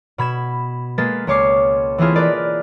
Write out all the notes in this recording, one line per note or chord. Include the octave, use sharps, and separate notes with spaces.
B2 B5 G#6 E7
G#3 A#3 B4 A6
C#2 G#3 C#5 D6 C7
E3 A3 C4 E4 F4 G#4
A#4 B4 D5 D#5